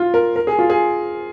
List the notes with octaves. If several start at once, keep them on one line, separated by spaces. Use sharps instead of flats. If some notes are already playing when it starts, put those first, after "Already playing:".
Already playing: F4
A#4
A#4
G#4
F4
G#4